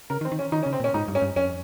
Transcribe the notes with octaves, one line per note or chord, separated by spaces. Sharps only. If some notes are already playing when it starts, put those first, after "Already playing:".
C#3 A#4
D#3
C4
D#3
C#4
D#3 D#4
C#4
C#3
C4
A#2 C#4
G#2 D#4
G2
C#4
G2
F2 C#4